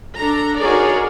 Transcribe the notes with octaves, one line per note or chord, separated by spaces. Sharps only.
D4 A4 A#5
D#4 F#4 G#4 A#4 C#5 D5